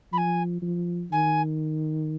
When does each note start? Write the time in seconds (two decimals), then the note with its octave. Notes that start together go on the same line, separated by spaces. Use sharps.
0.12 F3 G#5 B5
0.62 F3
1.12 D#3 G#5